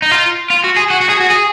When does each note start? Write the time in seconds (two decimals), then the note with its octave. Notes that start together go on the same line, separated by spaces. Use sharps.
0.02 D#4
0.11 F4
0.50 F4
0.64 F#4
0.77 G#4
0.91 F#4
1.01 F#4
1.10 G#4
1.21 F#4
1.30 G#4